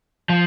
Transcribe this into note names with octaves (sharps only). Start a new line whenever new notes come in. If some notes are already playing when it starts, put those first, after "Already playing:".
F3